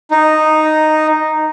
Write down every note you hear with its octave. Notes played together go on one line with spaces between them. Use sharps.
D#4